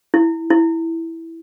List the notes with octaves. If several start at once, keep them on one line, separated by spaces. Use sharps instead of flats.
E4
E4